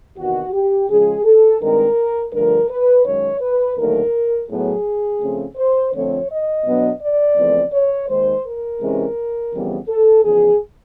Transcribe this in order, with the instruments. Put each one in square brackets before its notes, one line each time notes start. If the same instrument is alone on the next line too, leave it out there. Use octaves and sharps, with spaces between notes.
[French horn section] E2 C3 D#3 F#4
G4
C#3 F3 G#3 G#4
A4
G2 D#3 G#3 C4 A#4
G2 D3 F3 A3 A#4
B4
F#2 D#3 G#3 C#5
B4
D#2 D3 F#3 A3 A#4
A2 F#3 B3 G#4
C#3 F3 A3 C4
C5
F2 D3 F3 A3 C4 C#5
D#5
B2 F#3 B3 D4
D5
E2 C#3 F3 A3 C4
C#5
D#2 D#3 G#3 C5
A#4
C3 E3 G#3 C#4
F2 C#3 E3 G3 B3
A4
E2 C#3 F3 G#4